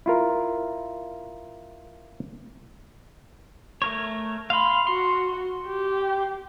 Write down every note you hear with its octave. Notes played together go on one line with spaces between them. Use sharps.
E4 F4 A#4
A3 A#4 C#5
F5 B5 C6
F#4 C6
G4